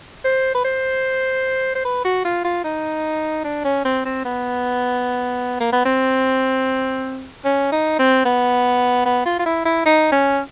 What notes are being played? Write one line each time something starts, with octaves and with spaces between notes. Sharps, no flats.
C5
B4
C5
C5
B4
F#4
F4
F4
D#4
D4
C#4
C4
C4
B3
A#3
B3
C4
C#4
D#4
C4
B3
B3
F4
F4
E4
E4
D#4
C#4